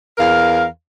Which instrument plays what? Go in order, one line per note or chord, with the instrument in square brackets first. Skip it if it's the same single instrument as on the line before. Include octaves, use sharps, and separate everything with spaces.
[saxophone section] E2 A#4 F5